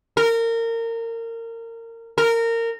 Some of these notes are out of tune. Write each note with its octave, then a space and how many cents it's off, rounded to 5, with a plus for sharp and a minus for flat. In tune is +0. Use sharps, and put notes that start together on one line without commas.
A#4 -25
A#4 -20